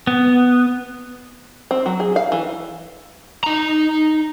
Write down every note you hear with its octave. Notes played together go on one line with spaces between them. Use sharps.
B3
C4
F#3
G#4
F5
E3
D#4 A#5